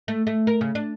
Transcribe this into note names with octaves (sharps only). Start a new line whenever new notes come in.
A3
A3
A#4
C#3
D4